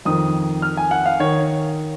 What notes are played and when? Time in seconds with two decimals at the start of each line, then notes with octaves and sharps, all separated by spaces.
0.05 F2 D#3 D#6
0.62 F6
0.77 G#5
0.91 F#5
1.06 F5
1.20 D#3 C#5